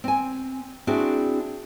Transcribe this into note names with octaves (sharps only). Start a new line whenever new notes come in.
C4 G#5
C4 D4 E4 F#4 G#4